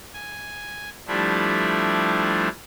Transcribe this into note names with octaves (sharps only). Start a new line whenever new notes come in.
G#5
F3 G3 A3 D4 E4